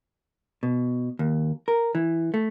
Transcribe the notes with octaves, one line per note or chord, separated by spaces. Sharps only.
B2
D#2
A#4
E3
A3